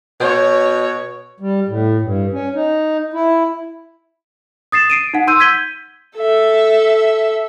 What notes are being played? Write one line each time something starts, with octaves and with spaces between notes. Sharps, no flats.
B2 C#5
G3
A2
G2
C#4
D#4
E4
D#6 A6 C7 E7
C7 D7 D#7
D#4 F#5
C6 E6 G6 D#7
G6 G#6 B6 D#7 G7
A4 E5